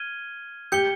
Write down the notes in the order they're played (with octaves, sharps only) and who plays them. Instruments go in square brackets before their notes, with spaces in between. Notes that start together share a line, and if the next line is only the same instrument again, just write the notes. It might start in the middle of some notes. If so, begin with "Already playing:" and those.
Already playing: [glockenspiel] F6 G#6 D#7 G7
[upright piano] G4 [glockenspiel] G6 C#7 G7